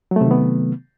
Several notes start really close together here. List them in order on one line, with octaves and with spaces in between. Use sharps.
F#3 A3 C3 D#3 B3